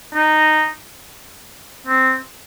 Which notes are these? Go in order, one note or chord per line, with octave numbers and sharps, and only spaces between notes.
D#4
C4